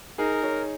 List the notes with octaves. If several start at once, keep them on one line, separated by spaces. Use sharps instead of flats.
D#4 G#4 A#4
G#4 C#5